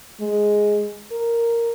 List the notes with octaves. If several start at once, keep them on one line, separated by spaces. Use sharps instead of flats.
G#3
A#4